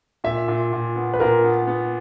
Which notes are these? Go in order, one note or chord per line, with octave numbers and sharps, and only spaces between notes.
A#2 E5
A#2
A#2
B3
B4
A#2 A#4
B3
B3